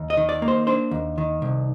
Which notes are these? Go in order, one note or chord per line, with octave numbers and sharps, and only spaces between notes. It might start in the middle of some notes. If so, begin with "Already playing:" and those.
Already playing: D#2
D#5
D#3
D5
A#3
C5
D4 C5
D#2
D#3
C2